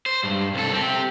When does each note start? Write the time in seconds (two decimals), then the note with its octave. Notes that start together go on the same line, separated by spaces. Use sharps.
0.06 C5
0.23 G2
0.54 C2 A4
0.73 C4 G4